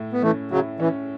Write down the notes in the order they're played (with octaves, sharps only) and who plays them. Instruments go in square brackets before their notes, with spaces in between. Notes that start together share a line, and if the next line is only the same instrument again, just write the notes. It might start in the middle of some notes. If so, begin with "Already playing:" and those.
Already playing: [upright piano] A2 E4
[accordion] B3
[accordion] E3 A3 [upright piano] C#4
[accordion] C#3 F#3 [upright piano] E4
[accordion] E3 [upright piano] C#4